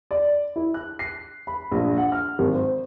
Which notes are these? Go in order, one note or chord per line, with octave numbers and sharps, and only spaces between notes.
D5
E4
F#6
C7
B5
A#1
F#5
F6
G#1
C5